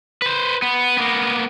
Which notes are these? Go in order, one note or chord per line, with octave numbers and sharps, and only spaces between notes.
B4 C5
B3
A#3 B3